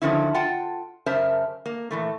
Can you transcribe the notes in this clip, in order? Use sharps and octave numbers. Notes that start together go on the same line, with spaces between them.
D3 D#3 F3 F#3 C#4 E4
F4 F#5 G5 A5
F#2 C#3 A#4 C5 E5 A5
A#3
A#2 E3 A3